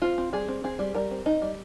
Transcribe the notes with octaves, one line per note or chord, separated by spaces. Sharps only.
C4 F4
C4
G3 G#4
C4
C4 G#4
G3
G3 A#4
C4
D#4
G3